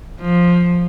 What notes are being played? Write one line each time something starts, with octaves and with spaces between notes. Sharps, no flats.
F3